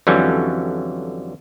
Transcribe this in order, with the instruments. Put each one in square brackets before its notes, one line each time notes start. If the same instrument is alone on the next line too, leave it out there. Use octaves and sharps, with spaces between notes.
[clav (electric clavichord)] F2 D3 E3 F#3 G3 C#4